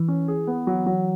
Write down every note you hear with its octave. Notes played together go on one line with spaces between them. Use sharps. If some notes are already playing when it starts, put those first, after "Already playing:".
Already playing: E3
C#4
G#4
B3
F#3
F#3